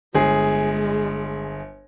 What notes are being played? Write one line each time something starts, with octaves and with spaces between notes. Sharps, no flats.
G1 G#3 G#4